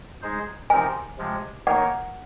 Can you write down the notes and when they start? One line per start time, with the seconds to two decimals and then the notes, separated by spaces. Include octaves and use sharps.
0.22 G#3 D#4 G#4 C5
0.70 C3 F3 C4 D#4 A#4 G#5
1.18 C3 F3 G#3
1.67 D#3 A#3 D#4 A#4 C#5 F#5